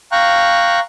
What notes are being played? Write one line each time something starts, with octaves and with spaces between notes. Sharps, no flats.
F5 G5 A#5 C#6 F#6